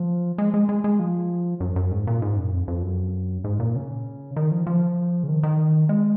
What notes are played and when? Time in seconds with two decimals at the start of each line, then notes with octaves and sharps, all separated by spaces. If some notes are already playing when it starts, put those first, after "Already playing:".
Already playing: F3
0.38 G#3
0.54 G#3
0.69 G#3
0.84 G#3
0.99 F3
1.60 F#2
1.76 F#2
1.91 G#2
2.07 A#2
2.22 G#2
2.37 F#2
2.53 F2
2.68 F2
2.83 F#2
3.44 G#2
3.60 A#2
3.76 C#3
4.36 D#3
4.51 F3
4.67 F3
5.23 C#3
5.28 D#3
5.43 D#3
5.89 G#3